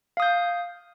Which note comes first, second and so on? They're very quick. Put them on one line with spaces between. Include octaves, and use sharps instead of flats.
F5 D#6 G6